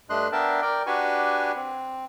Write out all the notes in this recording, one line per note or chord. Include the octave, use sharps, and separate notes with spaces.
G2 A3 D4 D#5 C6 F#6
B3 D4 A#4 E5 G5 A5
A#4 D5 G5
D4 F#4 G4 B4 G#5 C#6
C4